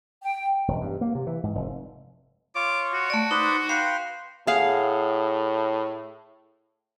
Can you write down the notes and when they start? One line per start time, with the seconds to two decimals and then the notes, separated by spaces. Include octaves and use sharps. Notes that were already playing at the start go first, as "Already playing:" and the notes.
0.21 G5
0.68 E1
0.82 G2
1.01 A#3
1.15 C3
1.27 E3
1.43 G#2
1.55 F1
2.55 F4 C#5 D6
2.94 F#4
3.10 A3 D5
3.31 D#4 B4 C5 D5
3.69 B4 F5 G5 C6
4.47 A2 G#4 F5 F#5